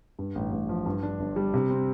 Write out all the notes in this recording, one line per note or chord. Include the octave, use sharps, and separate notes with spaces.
G2
A1
A1
F3
G2
D4
G1
G3
C3
C4